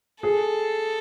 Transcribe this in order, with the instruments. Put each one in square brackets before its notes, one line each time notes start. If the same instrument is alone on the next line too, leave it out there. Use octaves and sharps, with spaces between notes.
[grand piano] G#4 [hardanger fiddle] A4